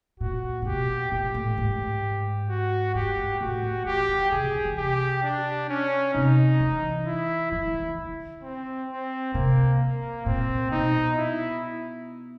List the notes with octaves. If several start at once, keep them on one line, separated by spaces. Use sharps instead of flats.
A#2 F#4
A#2
B2 G4
A#2 G4
A2
G#2
F#4
G2 G4
G#2
A2 F#4
D#3
E3 G4
D#3
C#3 G#4
D3
D#3
E3
C3 G4
D4
C#4
C3 D#4
E3
E4
F3 E4
E3
D#3
D3
C4
C4
C3 A#3
A#3
A#2 C4
B2 D#4
E4